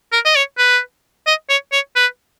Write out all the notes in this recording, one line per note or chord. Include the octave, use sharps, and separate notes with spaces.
A#4
D#5
C#5
B4
D#5
C#5
C#5
B4